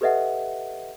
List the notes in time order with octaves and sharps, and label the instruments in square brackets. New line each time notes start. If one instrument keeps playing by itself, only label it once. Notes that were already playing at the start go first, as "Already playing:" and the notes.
[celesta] G4 A4 B4 D#5 E5 F#5